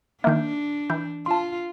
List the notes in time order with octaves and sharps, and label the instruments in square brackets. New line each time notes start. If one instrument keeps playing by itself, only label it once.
[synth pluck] D#3 A#3 [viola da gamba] D4 [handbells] E5 F6 G6
[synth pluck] E3 [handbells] G6
[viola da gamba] F4 [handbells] A5 C6